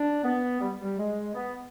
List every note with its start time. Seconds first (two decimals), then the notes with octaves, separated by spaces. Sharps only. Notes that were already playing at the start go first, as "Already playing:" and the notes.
Already playing: D4
0.24 B3
0.61 G3
0.82 G3
0.98 G#3
1.35 B3